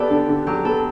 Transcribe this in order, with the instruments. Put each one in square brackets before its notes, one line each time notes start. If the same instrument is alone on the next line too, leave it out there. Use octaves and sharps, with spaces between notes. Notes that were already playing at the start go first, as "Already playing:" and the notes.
Already playing: [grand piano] B3 [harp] G4 A4 D5
[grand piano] D3
D3
[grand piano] F#3 [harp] G4
[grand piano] B3 [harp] A4